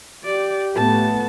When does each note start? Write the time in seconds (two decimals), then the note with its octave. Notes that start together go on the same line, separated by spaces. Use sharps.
0.25 G4 D5
0.76 A2 A3 B3 A5